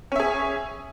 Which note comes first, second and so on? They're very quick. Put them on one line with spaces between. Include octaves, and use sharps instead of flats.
C#4 E5 G#4